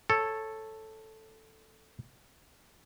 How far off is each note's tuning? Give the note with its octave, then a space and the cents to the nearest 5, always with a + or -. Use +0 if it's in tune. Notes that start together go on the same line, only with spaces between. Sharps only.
A4 +0 C#5 -10